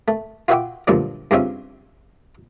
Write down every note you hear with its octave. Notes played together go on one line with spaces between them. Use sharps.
A3
F4 F#4 B4 E5 G5 D6
D2 G2 A#2 D3 F3 F#3
G2 C#3 C4 C#4 F4 E5